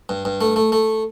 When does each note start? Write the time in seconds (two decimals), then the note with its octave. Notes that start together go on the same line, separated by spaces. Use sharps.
0.09 G2
0.25 G2
0.41 A3
0.56 A3
0.72 A3